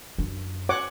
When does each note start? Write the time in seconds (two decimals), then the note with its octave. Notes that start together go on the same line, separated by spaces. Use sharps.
0.18 F#2 D4
0.69 C#5 F#5 D6